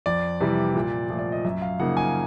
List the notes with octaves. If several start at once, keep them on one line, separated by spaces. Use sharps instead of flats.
F2 D5
C3 E3 G3
A#2
F3 A3
D5
D#5
F#2 E5
F5
C#3 F3 A#3 D#4 F#5
G#5